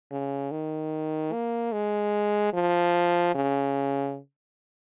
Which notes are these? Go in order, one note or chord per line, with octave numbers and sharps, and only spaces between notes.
C#3
D#3
A#3
G#3
F3
C#3